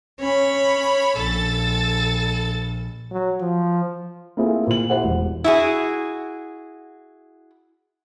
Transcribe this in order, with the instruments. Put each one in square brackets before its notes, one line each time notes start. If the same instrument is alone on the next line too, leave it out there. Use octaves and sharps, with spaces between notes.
[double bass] C#4 [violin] C#5 B5
[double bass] A#1 [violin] A4 A6
[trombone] F#3
F3
[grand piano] A#3 C4 E4 F4 G#4 A4
A#2 F#7
E4 G4 C5 F#5
E1
[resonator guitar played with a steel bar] E4 F#4 G#4